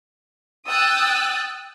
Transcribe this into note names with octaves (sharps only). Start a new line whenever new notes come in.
G5 D#6 E6 F#6 A6